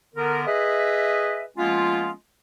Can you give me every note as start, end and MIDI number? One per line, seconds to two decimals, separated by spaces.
0.15 0.44 50
0.15 0.44 59
0.15 0.44 70
0.46 1.45 68
0.46 1.45 71
0.46 1.45 75
0.46 1.45 76
1.57 2.10 53
1.57 2.10 56
1.57 2.10 58
1.57 2.10 59
1.57 2.10 61
1.57 2.10 65